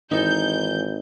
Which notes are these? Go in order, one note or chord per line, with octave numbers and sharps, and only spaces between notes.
G#1 E3 D#4 A4 G6